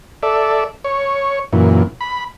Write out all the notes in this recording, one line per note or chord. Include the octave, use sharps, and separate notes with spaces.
A4 D5 E5
C#5
F#2 A#2 E3
B5